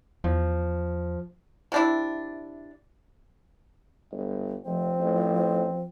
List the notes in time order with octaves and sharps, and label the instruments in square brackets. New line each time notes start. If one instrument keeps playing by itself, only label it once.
[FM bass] E2 [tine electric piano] F3
[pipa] C3 D4 E4
[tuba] G1
[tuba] F1 [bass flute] F3 [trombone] C4
[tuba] A1